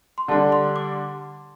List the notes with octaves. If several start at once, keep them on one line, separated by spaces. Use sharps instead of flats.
C6
D3 G3 D4 A5
C6
D6